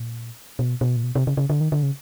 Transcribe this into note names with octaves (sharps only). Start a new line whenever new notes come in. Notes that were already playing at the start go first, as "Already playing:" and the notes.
Already playing: A#2
B2
B2
A#2
B2
C3
C#3
C#3
D3
D#3
D3
C#3